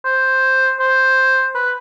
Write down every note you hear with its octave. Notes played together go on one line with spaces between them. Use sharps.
C5
C5
B4